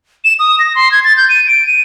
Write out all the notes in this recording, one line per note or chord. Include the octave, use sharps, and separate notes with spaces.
E7
D#6
A#6
C6
G#6
A6
G6
D#7
D7
D#7